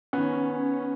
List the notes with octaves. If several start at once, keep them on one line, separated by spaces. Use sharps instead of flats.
D#3 B3 C#4